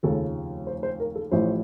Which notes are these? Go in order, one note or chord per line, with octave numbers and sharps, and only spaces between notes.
F1 D#2 C#3 F3 A4
C5
C5
A#4
A4
A1 A2 F3 C5